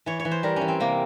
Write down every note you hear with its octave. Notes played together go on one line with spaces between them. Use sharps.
E3 C#5
C#5
E3
C5
G3 A#4
E3 C#4
C4
C3 A#3